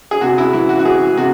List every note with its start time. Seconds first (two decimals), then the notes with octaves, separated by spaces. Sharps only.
0.11 G#4
0.21 C3 F#4
0.38 E4
0.53 E3 E4
0.69 F#4
0.79 F#4
0.85 E3 G#4
1.17 C3 F#4